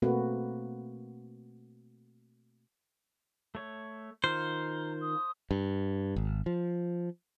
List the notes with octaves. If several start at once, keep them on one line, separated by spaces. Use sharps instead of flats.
B2 A3 A#3 C4 F#4 B4
A3 C#5
D#3 F4 C5 F5 A#5
D#6
G2
G#1
F3